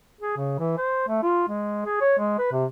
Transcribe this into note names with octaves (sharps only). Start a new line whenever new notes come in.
G#4
C#3
E3
C5
A3
F4
G#3
G#4
C#5
G#3
B4
C3